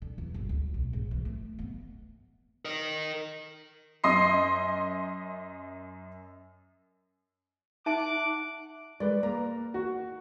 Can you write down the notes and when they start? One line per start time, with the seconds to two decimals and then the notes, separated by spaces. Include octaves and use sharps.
0.02 D3
0.18 E2
0.34 G1
0.49 D2
0.74 B1
0.93 G#2
1.11 E3
1.25 A3
1.59 B3
2.65 A#4 D#5
4.04 F#2 D#5 C6 C7
7.86 D#4 E5 F#5 A5 D6
9.00 G#3 B4 D5
9.23 A#3 A#5
9.74 F#4